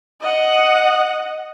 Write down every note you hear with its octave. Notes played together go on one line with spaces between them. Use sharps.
D#5 F#5